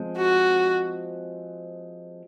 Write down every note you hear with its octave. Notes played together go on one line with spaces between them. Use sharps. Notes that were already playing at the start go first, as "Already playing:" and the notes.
Already playing: F3 G#3 C4
F#4